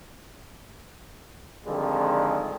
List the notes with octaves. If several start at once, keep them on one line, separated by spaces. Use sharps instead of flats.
F2 D3 D#3 F3 G3 G#3